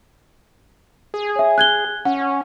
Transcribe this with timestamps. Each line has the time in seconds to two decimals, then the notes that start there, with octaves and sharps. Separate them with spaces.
1.14 G#4
1.36 C#5 E5
1.58 F#6 G#6 G7
2.05 C#4 F#5